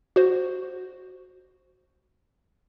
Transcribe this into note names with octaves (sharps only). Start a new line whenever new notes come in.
F#4 C5